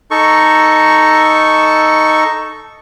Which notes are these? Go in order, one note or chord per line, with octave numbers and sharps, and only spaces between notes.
D#4 A4 C#6